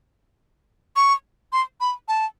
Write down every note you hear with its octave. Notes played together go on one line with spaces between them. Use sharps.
C#6
C6
B5
A5